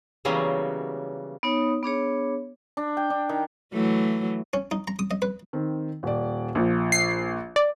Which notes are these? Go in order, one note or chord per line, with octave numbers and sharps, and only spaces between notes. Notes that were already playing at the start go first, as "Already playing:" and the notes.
C#3 E3 F#3 G3 A#3 B3
B3 D#4 C#5 D#6
B3 D4 G#4 C#5
D4
G5
D4
D#3
E3 F#3 A3
C#4
D#4
A#5
D#6
D#5
B4
D#3 C4
D#1 D5
A#1 F3
C7
D5